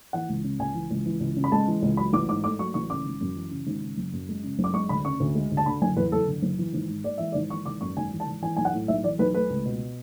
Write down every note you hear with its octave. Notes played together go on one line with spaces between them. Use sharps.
E3 F#5
C#2
C#3
C#2 G#5
E3
C#2
E3
C#2
C#3
B5
G#3 A5
E3
C#2
F#3 B5
A1 D6
G#2 D6
A3 D6
F#3 C#6
A1 C#6
C#3 D6
G#1
F#2
E3
C#3
G#1
C#3
F#1
F#2
G#3
C#3
F#1
D6
G#3 C#6
D2 B5
C#3 C#6
D2
G#3
D2
A5
D3 B5
F#1 G#5
E2 B4
F#1 A4
D3
F#1
E3
G#1
G#2
G#3 D5
E3 E5
D5
G#1
E3 C#6
G#1 D6
F#2 C#6
G#1 G#5
E3
A5
G#1
E3 G#5
B1 G#5
F#5
A2
B1 E5
E3 D5
B1 B4
A3 B4
C#2
B2